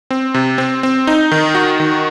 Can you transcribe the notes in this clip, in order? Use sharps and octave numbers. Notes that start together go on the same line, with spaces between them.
C4
C3
C4
C4
D#4
D#3
F#4
D#3